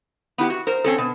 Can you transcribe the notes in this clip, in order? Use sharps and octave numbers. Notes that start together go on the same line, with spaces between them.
B3 E4 G4 F#5
F#4
A#4 C5
C4 C#4 A4
B2